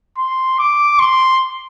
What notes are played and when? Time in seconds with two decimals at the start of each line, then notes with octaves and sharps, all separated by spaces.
0.18 C6
0.59 D6
0.99 C6